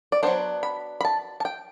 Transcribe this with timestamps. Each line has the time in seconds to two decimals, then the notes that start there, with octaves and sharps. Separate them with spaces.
0.12 D5
0.23 F#3 B3 D4 C5
0.63 B5
1.01 B5
1.05 A5
1.40 A5
1.45 G5